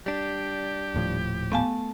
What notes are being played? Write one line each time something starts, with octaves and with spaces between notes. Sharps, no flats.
G3 D4 G4
D#1 A2 F3
A3 B3 F5 G#5 A5